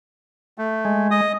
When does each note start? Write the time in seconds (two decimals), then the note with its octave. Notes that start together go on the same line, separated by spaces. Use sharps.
0.58 A3
0.85 G#3
1.11 D#5 D#6